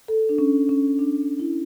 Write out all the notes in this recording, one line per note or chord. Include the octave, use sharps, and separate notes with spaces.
A4
D4
C#4
C#4
D4
E4